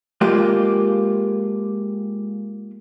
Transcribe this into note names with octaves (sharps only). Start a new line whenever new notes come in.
G#3 A#3 F4 G4